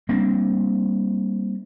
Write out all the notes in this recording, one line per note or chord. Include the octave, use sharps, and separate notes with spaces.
G3 A#3 C4 D4